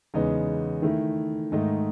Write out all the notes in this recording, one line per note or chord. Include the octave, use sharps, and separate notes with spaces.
E2 C#3 G#3 B3 D#4
D#3 A3 E4
G#2 D#3 A3 D#4